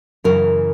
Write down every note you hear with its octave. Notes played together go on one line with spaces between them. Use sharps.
F#2 C#3 E3 A#4